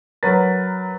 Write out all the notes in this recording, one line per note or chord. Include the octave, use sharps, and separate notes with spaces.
F#3 A#4 B4 A6